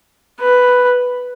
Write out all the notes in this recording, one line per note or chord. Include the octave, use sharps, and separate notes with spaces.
B4